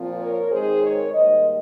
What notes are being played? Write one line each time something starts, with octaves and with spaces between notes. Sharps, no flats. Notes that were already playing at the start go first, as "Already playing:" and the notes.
Already playing: A#2 F3 C4
A#4 C#5
G#2 D#3 G#3 C4 G#4 C5
A#4 C#5
G#2 D#3 G3 A#3 C5 D#5